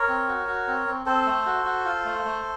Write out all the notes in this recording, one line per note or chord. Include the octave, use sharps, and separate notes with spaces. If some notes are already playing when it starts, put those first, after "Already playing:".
Already playing: A#4 C#5
C4
F#4
F#4
C4
C4
C4 A4 C5
A3
F#4
F#4
F4
A3
A3